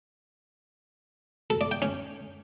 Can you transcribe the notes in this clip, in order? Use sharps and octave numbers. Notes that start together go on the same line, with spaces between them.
A4
D5
G5
C#4